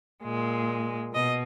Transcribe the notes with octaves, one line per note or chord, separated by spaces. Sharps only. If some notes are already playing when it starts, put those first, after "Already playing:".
A#2 G#3
B2 D#5